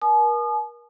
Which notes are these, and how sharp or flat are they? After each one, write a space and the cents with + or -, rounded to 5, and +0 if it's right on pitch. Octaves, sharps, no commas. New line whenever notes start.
A#4 +35 G#5 +45 D#6 -35